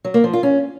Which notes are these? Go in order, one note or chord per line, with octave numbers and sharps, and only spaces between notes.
F#3
A#3
F3
F4
C#4